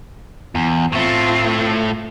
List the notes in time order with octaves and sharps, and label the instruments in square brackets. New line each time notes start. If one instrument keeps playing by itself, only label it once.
[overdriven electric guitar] E2
[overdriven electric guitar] A2 A3 [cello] C4 F4